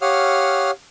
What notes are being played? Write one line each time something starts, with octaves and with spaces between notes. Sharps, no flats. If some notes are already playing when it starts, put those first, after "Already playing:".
G4 C#5 F5 F#5 D#6 F6